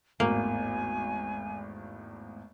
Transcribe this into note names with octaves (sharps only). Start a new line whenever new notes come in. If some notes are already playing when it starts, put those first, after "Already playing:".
G#1 E2 A2 A#3 G#5